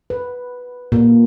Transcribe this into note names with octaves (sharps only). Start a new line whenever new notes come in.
B4
A#2